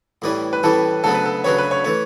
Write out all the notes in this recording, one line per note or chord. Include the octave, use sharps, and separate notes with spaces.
A2 E3 G3 C#4
B4
A2 E3 G3 C#4 A4
D2 C#3 F#3 B3 A4
B4
A4
D2 C#3 F#3 B3 C#5
B4
C#5
E3 A3 C#5